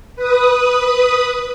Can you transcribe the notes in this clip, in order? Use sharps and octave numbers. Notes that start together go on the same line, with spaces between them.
B4 D#6